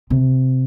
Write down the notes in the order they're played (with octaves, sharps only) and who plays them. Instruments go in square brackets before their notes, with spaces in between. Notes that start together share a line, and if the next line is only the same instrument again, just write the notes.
[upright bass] C3